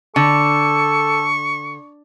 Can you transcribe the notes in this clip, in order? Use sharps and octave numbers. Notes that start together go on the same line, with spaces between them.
D3 A4 C#6